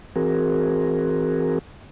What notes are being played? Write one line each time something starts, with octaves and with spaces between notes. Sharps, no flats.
E3 C4 F#4 G#4 A#4